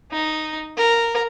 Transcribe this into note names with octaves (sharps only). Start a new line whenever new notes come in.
D#4
A#4